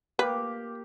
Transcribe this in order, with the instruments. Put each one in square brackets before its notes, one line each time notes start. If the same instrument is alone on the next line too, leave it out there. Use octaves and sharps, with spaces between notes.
[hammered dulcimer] A#3 G4 D6 [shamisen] B4